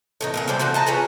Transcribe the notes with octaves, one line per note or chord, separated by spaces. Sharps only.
A2 E3 D#4
A#2 B3 G#4
G3 A3 C5 D5
E3 A3 F#4 C5
D#5 A5 A#5
F4 G#4 B4 C#5